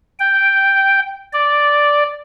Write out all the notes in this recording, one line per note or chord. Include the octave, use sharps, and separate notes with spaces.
G5
D5